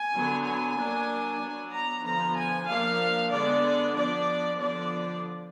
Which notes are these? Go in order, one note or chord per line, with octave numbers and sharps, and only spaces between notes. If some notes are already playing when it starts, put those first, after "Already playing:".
Already playing: G#5
D3 F#3 B3
G#5
F#3 A#3 D4
F#3 B3 D4
A#5
D3 F3 B3 A#5
G#5
F3 A#3 D4 F5
D3 G#3 B3 D4 D5
F3 B3 D4 D5
D3 F3 B3 D4 D5